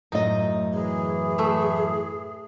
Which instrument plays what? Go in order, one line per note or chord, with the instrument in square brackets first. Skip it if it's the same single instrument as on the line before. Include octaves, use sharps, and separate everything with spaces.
[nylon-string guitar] F#2 A2 D#5 [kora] D#4
[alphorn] E3 [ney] G#4
[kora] A3 E5